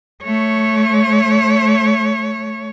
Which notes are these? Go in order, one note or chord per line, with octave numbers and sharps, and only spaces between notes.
A3 C#5